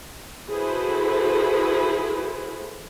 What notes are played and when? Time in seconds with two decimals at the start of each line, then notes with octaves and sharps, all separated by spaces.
0.50 E4 F#4 G#4 A4 B4 C5